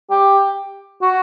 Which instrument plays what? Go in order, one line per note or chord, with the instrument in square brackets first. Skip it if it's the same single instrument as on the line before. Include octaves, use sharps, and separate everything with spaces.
[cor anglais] G4
F#4